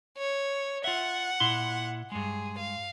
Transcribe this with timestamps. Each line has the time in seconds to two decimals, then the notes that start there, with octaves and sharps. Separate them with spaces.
0.17 C#5
0.84 F4 E5 F#5
1.40 A#2 E4 C6
2.12 G2 G#3 G#4
2.58 F5